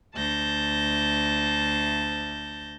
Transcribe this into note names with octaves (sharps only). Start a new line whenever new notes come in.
D2 A5 G6 A#6